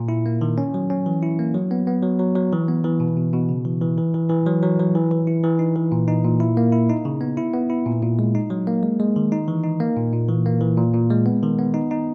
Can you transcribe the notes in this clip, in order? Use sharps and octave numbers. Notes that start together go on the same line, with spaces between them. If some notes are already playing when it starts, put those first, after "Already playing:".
Already playing: A#2
E4
A#3
D#3
C#4
F#3
C#4
E3
E4
A#3
F#3
B3
B3
F#3
F#3
F#3
E3
B3
E3
B2
B2
B2
C#3
E3
E3
E3
E3
E3
F#3
F#3
F#3
E3
E3
E4
E3
D#4
E3
A#2
D#4
A#2
E4
A#3
E4
D#4
C#3
B3
E4
B3
E4
A#2
A#2
G#3
D#4
F#3
A#3
G#3
G#3
D#3
D#4
E3
D#4
A#3
A#2
A#2
E3
A#3
E3
A#2
A#2
G#3
B3
D#3
B3
D#4
D#4